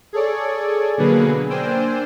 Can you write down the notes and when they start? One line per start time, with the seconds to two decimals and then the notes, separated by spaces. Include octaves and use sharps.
0.13 G#4 A4 C#5 D5
0.97 B2 D3 F#3 A#3 G#4 B4
1.49 A#3 D4 C5 G5 G#5 E6